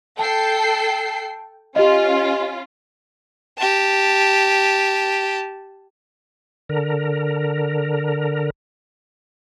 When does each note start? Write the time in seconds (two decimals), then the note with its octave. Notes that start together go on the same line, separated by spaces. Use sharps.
0.19 A4 G5 A5 C7
1.76 C#4 F4 G4 D#5
3.58 G4 A5
6.69 D3 A#4